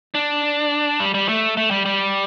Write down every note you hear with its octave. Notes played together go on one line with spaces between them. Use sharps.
D4
G3
G3
A3
A3
G3
G3